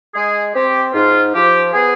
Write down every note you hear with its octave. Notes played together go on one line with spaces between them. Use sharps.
G#3 G#4
C4 G4
G#2 F4
F3 G4
B3 G#4